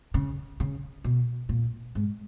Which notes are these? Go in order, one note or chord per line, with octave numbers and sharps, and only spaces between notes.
C#3
C#3
B2
A#2
G#2